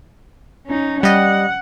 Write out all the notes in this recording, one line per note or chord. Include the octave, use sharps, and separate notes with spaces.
C#4 D#4
G3 D#5 F#5